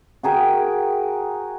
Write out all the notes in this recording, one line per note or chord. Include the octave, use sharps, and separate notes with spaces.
F#4 G#4 A#4 G5